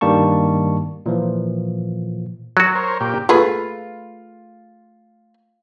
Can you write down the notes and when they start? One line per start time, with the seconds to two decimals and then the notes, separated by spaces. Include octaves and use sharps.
0.01 G2 D#3 G3 A#3 A5 C#6
1.06 A#2 E3 F3
2.57 F#3 F#4
2.75 A#4 C5 C#5
3.00 A#2 G4
3.29 A3 F4 G#4 B4